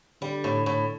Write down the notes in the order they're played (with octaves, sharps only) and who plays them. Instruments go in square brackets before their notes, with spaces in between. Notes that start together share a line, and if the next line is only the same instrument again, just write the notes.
[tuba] D3 [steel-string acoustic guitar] G3
[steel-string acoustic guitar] A2
A2